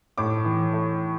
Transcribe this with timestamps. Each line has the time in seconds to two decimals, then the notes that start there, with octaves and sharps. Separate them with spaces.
0.18 A2 D6
0.45 E3
0.72 A3